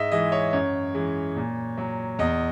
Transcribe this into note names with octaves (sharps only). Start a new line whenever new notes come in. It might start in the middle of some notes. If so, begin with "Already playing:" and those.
Already playing: G#2 D#5 E5
E3 G#3 D#5
C#5
F#2 C#5
E3 G#3
A#2
F#3
E2 D#5